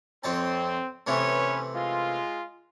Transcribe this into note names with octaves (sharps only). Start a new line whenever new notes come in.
F2 C4 C#5 A5
C3 E3 A3 C#4 B4 C#5
G#3 F4